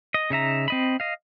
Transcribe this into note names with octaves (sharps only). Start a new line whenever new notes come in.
D#5
C#3 D#4 E5 A#5
C4 D#5 B5
D#5 F5